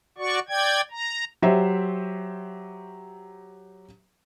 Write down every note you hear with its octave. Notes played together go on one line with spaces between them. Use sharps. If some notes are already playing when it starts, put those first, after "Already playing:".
F#4 D5 C#6
D5 G5 G#6
A#5
F#3 G4 C5 E5